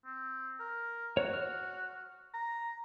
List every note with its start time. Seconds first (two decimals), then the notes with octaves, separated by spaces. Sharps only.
0.05 C4
0.60 A#4
1.17 F#4 C#5
1.33 F6
2.34 A#5